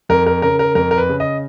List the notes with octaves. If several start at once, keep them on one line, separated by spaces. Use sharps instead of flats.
F2 A#4
A#4
C#3 A#4
A#4
F2 A#4
A#4
B4
C#3
D#5